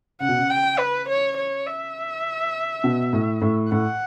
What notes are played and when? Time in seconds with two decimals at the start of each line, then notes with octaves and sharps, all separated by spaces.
0.20 C#3 F#5
0.29 B2
0.37 C#3
0.50 G5
0.79 B4
1.09 C#5
1.37 C#5
1.67 E5
2.84 B2
3.13 A2
3.41 A2
3.71 A2 F#5